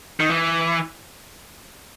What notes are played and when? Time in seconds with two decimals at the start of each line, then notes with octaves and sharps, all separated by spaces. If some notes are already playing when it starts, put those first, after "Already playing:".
0.20 D#3
0.30 E3